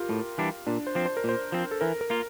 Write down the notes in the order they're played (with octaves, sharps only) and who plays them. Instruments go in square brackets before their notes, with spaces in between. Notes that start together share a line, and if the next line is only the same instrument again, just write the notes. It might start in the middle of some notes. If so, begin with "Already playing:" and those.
Already playing: [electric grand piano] F4 G4 A#4
[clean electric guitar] A2
E3 G3 D4
[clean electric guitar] A#2 [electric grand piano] D4
[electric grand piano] C5
[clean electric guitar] F3 C4
[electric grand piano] C5
A#4
[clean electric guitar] A#2 [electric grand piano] C5
[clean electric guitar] F3 C4
[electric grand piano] A4
[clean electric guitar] E3 [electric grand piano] A#4
[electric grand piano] A#4
[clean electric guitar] A#3 F4